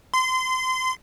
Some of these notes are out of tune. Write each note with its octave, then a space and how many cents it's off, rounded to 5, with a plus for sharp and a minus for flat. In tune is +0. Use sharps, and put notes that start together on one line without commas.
C6 -25